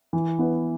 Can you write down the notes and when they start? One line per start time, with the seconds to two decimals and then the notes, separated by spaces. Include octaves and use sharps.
0.13 E3
0.39 B3 E4 B4